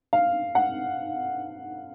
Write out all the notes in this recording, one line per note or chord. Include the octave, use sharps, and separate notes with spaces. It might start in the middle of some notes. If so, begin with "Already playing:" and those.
F5
F#5